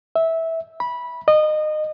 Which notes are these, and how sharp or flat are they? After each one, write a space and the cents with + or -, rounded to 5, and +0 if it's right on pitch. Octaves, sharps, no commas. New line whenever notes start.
E5 -15
B5 -15
D#5 -25